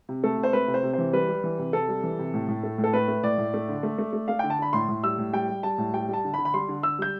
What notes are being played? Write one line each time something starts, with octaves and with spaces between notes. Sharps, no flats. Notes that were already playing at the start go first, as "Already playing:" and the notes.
C3
A3 A4
C3
C5
A3 B4
C3
C5
C3
E3 C5
G3 B4
G3
E3
C3
C3 A4
G3
E3
C3
A2
A2
A3
A2
A4
A3 B4
A3
A2 D5
A2
A3
D3
A3
A3
A3
A3 F5
D3 G5
A5
D3 B5
A2 C6
A2
G3 E6
A2
G3 G5
G3
G3 A5
A2
G3 G5
G3
A5
D3
B5
D3
B5
G3 C6
D3
D3 E6
G3 G6